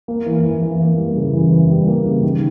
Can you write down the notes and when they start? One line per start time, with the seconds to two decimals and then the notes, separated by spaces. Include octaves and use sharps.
0.08 A#3
0.26 E3
0.44 E3
0.62 E3
0.81 A#3
0.98 G3
1.17 C#3
1.33 E3
1.52 E3
1.70 G3
1.87 A#3
2.05 C#3
2.23 D#3